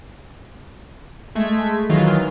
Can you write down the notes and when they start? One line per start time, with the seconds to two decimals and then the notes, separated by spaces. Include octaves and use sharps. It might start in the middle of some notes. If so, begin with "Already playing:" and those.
1.35 G#3 A3 G#6 B6
1.89 D#3 E3 F#3 G#3 F4